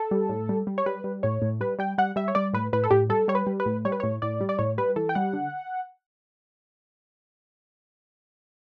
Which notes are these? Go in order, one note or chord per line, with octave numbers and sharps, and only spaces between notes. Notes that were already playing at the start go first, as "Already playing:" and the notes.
Already playing: A4
G3
A2
G3
G3
C#5
G3 B4
G3
A2 C#5
A2
G3 B4
G3 G5
G3 F#5
G3 E5
C#5
G3 D5
A2 B4
A2 B4
A4
A2 G4
G3 A4
G3 C#5
B4
G3
B4
A2
G3 C#5
B4
A2 C#5
A2 D5
G3
D5
A2 C#5
G3 B4
E3 A4
G5
G3 F#5
D3